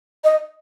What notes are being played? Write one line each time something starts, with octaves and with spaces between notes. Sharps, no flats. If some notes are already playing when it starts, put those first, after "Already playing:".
D#5